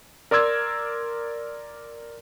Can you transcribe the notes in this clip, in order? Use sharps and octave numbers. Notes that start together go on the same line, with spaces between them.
A#4 D5 C6 E6 G#6